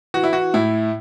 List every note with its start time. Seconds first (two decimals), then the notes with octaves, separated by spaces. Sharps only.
0.14 E3 F#4
0.24 E4
0.33 F#4
0.54 A2 E4